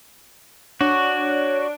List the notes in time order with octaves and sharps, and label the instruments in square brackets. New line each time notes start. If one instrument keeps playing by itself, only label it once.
[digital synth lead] D4 [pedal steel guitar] F#4 [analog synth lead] C#5